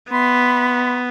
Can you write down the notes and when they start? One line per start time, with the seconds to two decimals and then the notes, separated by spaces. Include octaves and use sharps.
0.10 B3 E5 B5 C6